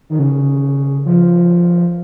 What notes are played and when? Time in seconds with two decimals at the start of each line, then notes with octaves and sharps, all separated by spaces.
0.10 D#3
0.19 C#3
1.06 F3